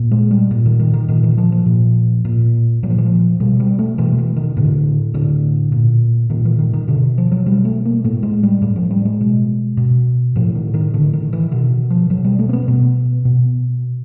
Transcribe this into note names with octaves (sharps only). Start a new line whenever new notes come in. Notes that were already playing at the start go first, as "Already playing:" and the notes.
Already playing: A#2
G#3
G3
A#2
D#3
D#3
D#3
A#2 D#3
E3
F3
F3
A#2
A#2
A#2 F#3
F3
E3
F3
B2 G3
G3
A3
B2 E3
E3
D#3
A2 D3
A2 D3
A#2
A#2 D#3
E3
D#3
D#3
B2 D3
F3
F#3
B2 G3
A3
A#3
A2 A3
G#3
G3
A2 G3
F3
G3
G#3
B2
B2
A2 F3
D#3
D#3
A2 D3
D#3
E3
B2 D#3
F3
B2 F#3
G3
A3
C4
B3
B2
B2